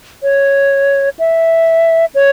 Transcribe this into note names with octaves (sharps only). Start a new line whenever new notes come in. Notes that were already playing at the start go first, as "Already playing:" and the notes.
C#5
E5
C#5